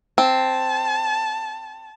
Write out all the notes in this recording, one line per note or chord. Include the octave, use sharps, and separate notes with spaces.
C4 A5